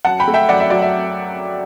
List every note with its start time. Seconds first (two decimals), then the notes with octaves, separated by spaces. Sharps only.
0.05 F#2 F#5 A5
0.19 G5 B5
0.28 A3
0.34 E5 G5
0.49 F#2 D5 F#5
0.60 E5
0.70 F#3 D5
0.82 E5